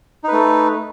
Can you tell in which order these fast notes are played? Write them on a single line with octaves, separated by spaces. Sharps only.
D#4 B4 A3